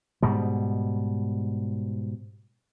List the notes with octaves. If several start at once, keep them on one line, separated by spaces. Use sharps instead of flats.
G#2 B2 G3